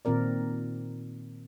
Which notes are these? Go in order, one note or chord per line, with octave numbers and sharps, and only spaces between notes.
A#2 D#3 C4 A#4 D5